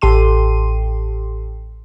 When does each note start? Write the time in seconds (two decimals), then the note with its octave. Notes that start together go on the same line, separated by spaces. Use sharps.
0.02 A1 G4 A4 C6 D#7